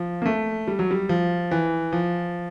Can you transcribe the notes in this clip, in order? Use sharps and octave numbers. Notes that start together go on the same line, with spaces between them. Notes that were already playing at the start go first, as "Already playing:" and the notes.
Already playing: F3
A#3
A3
G3
F#3
G3
F3
E3
F3